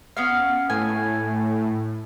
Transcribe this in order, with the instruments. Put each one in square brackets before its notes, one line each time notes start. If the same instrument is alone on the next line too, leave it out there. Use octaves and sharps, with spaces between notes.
[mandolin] B3 C#4 F5
[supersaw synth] A2 [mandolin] G#5